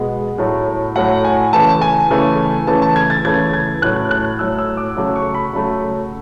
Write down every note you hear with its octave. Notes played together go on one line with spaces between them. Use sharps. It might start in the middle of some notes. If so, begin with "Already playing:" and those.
Already playing: B2 G#3 B3 F#5
A2 F#3 A3
A2 F#3 A3 F#5
G#5
C#3 E3 A3 A5
G#5
C#3 E3 A3
C#3 E3 A3 A5
A5
G#6
A6
C#3 E3 A3 G#6
G#6
A2 F#3 A3 F#6
F#6
A2 F#3 A3 E6
E6
D6
C#3 F#3 A3
C#6
B5
C#3 F#3 A3